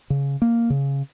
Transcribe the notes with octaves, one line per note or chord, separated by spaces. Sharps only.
C#3
A#3
C#3